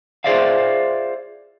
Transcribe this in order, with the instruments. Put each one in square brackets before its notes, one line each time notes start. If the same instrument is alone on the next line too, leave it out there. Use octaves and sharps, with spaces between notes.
[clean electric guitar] F4 G#4 C5 D5 E5 F5